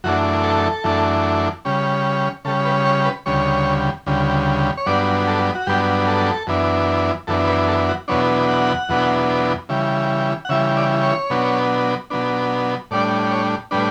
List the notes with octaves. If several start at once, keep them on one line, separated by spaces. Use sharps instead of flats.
F#2 E3 A3 D4 F#4
A4
F#2 E3 A3 D4
C#3 G3 C#4
C#3 G3 C#4 A4
B4
C#5
B4
D2 C#3 G3 C#5
D2 C#3 G3
C#5
G2 F#3 B3 D4 D5
A4
F#4
G2 F#3 B3 D4 G4
A4
F#2 E3 B3 D4
F#2 E3 B3 D4 A4
B4
A4
F#4
E2 B2 F#3 B3 D4 C#5
F#5
E2 B2 F#3 B3 D4
C#3 E3 G3
F#5
C#3 E3 G3 E5
D5
C#5
B2 F#3 B3 D4
B2 F#3 B3 D4
A2 G3 D4 D5
C#5
A2 G3 D4 B4